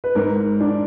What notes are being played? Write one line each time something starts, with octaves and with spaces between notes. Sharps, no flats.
B4
G#2 A#4
D4